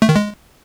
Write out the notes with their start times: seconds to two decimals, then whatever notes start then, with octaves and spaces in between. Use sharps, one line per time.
0.02 A3
0.09 D#3
0.16 G#3